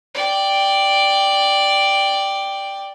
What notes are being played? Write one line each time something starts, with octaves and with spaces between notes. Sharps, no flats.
D5 G5